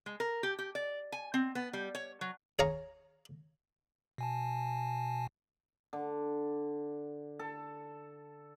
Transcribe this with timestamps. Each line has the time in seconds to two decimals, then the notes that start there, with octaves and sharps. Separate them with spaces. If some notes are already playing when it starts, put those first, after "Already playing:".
0.06 G#3
0.20 A#4
0.43 G4
0.59 G4
0.75 D5
1.12 G#5
1.34 C4
1.55 B3
1.73 G3
1.95 C#5
2.21 F#3
2.59 G#4 C#5 F5 A#5 C#6
4.18 B2 G#5 A5
5.93 D3
7.39 A4